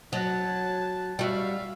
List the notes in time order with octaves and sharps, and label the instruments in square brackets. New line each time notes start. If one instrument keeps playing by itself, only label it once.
[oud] F#3 [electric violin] A5 F#6
[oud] G3 F#4 [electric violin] E5 F5